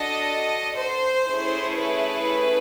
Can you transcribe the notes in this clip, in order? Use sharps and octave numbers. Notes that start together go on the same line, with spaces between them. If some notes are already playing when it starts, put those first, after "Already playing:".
Already playing: D4 F#4 A4 D#5
C5
A3 C#4 E4 G#4
B4